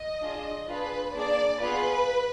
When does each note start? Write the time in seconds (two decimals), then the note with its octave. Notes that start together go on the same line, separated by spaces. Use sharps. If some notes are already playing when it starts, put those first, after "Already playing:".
Already playing: D#5
0.21 D4 F4 G#4
0.68 D4 F4 G#4 B4
1.14 A#3 D4 G#4 D5
1.61 B3 F4 G#4 B4